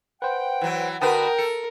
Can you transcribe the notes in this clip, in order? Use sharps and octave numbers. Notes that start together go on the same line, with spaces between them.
B4 C5 F#5 G5
E3 F#3
D3 F#4 A#4 B4 F#5 G5 A5 D#6
A4 C#7